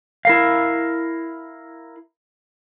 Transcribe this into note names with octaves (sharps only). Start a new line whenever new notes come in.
E4 A#4 F5